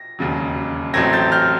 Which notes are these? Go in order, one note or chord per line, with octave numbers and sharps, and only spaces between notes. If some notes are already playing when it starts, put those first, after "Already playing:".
Already playing: A#6
E1 D#2 C#3 F#3
A1 A2 F#3 A3 C4 G#6 A#6
G6 A6
F6 G6